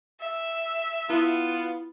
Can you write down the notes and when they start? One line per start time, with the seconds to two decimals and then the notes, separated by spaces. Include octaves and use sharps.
0.21 E5
1.10 B3 E4 F4